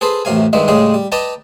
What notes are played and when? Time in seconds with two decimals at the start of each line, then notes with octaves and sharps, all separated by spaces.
0.01 G#4 A4 B4 C5
0.25 A1 F#2 C3 F5 G#5
0.53 C2 G2 D#3 G#3 E5
0.68 A2 C#3 G3 G#3 G#4
0.94 G3
1.12 B4 D5 D#5 G5 A5 A#5